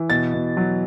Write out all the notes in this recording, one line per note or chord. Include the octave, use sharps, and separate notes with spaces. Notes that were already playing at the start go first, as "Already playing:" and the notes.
Already playing: E3
B2 A6
B2
F#3